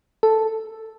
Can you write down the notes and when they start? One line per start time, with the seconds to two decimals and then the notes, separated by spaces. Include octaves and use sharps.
0.23 A4